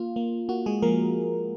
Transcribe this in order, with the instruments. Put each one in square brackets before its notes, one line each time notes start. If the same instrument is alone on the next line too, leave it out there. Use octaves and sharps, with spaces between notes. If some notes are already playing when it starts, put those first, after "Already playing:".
Already playing: [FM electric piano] A#3 F4
A#3
A#3 F#4
G#3 G#4
F3 A#3 A#4